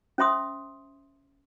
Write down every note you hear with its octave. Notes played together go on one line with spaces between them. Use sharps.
C#4 C5 E5 C6 D#6